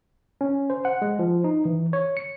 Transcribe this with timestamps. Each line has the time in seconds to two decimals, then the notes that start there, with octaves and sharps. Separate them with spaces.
0.41 C#4
0.70 C5
0.85 F#5
1.02 G#3
1.19 F3
1.44 D#4
1.65 E3
1.93 C#5
2.17 C#7